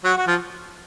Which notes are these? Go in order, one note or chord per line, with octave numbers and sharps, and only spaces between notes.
F#3 F#4
F#4
F3 F4